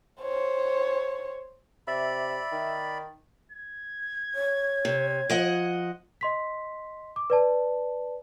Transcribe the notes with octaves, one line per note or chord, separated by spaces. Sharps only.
C5 C#5
C3 D5 E5 B5
D#3
G#6
C#5
C3
F3 D#5 F#5
D#5 C6 B6
D6
B4 D5 A5